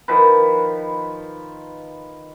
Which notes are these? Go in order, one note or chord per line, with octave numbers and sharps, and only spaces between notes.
D#3 F3 B4